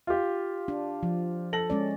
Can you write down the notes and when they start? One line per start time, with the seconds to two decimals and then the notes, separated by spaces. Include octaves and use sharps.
0.07 F4 G4
0.68 D4
1.03 F3
1.53 A4 A#6 F#7
1.70 G#3 C#4 D5